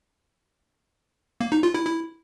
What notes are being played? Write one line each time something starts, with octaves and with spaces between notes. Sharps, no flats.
A#3
D#4
F4
E4
E4